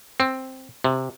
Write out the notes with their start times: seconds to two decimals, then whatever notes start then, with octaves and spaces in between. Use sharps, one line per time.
0.20 C4
0.84 C3